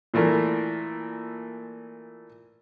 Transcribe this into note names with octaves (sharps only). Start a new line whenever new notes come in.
A#2 E3 A3 A#4